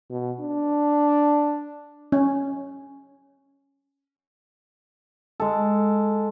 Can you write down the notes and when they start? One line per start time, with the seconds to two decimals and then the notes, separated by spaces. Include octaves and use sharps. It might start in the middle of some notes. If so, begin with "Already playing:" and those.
0.10 B2
0.40 D4
2.12 C#4
5.40 G#3 A4